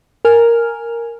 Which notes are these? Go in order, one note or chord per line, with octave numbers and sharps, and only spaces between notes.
A#4 G#5 F6